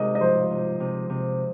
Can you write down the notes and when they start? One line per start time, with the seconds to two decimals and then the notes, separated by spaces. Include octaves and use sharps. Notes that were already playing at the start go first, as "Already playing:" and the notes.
Already playing: C3 G#3 D#4 G#4 A#4 D#5
0.15 D#5
0.21 F3 C5
0.50 C3
0.80 C3
1.10 C3